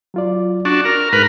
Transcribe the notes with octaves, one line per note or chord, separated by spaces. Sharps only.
F#3 F4 D5
D4 F#4 C#6
A#4
G#2 A#4 B4